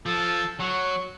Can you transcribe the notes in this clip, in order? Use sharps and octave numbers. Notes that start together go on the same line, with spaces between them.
F3 A4
F#3 C#6